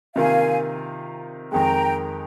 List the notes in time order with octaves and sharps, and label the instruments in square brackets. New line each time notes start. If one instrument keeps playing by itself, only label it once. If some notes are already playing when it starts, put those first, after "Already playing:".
[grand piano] C3 D#3 A#3 F4 [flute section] F5 G#5
[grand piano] F2 D#3 G#3 [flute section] G5 A#5